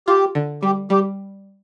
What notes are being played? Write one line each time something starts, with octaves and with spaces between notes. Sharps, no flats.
F4 G4
D3
G3 G4
G3 G4